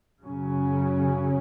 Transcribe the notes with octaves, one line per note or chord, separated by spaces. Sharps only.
F#2 C#3 F#3 C#4